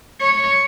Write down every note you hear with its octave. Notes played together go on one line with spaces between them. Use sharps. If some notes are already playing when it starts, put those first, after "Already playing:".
C#5